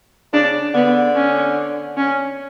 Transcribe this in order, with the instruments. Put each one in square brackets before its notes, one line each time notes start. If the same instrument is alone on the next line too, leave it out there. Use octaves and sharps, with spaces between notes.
[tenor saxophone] C#3 [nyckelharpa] D4
[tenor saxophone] D3 [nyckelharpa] B3
[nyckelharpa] C#4
C#4